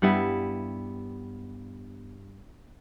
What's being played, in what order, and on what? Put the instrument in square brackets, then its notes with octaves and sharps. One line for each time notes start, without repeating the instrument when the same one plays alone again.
[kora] G2 G3 B3 E4